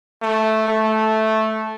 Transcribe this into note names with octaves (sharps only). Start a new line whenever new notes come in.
A3
A3